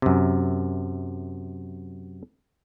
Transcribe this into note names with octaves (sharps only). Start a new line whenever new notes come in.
F#2 C3